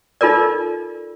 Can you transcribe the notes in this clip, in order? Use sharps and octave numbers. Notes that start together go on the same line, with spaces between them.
D#4 F4 A4 A#4 D5